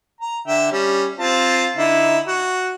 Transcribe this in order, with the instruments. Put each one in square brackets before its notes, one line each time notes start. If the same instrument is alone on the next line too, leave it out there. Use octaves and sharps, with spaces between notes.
[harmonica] A#5
D3 E5 G5
G3 C#4
C4 F4 A5
D3 D#4 E4
F#4